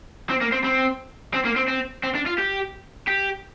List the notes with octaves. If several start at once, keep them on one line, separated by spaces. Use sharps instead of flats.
C4
A#3
C4
C4
C4
A#3
C4
C4
C4
D4
F4
G4
G4